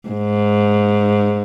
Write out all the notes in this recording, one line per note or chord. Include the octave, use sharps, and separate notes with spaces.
G#2